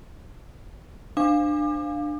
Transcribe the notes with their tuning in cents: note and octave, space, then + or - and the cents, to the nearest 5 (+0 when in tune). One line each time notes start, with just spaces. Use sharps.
D4 +20 F5 +5 D6 +35